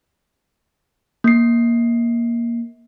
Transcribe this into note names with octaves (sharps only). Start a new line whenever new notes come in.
A#3 C7